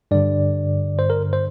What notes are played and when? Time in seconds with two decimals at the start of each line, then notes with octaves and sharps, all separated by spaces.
0.11 G2 D3 D5
0.99 C5
1.10 A#4
1.33 C5